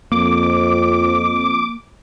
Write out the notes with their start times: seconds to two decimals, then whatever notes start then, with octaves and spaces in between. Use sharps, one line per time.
0.12 F2 A#3 D6